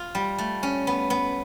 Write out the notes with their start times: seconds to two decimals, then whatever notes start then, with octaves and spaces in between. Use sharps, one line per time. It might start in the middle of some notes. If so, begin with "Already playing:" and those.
Already playing: F4
0.15 G3
0.38 A3
0.63 C#4
0.87 B3
1.10 B3